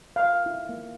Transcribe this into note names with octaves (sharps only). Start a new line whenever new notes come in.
F5
E4
A#3